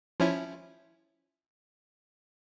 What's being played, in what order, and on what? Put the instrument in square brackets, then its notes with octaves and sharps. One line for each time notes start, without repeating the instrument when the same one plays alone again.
[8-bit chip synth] F3 C#4 E4